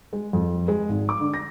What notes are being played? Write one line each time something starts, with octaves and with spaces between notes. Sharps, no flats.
G#3
F2
G#3
G#1
D6
D3
A#6